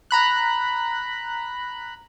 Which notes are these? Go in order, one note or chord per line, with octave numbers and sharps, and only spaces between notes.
A#5 B5 F#6